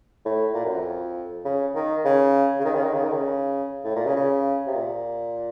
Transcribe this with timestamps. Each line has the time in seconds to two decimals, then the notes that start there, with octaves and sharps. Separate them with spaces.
0.25 A2
0.54 A#2
0.65 F#2
0.75 F2
1.45 C#3
1.75 D#3
2.05 C#3
2.59 C#3
2.64 D#3
2.75 C#3
2.84 D#3
2.94 C#3
3.04 D#3
3.13 C#3
3.84 A2
3.96 A#2
4.05 C#3
4.16 C#3
4.67 C3
4.75 A#2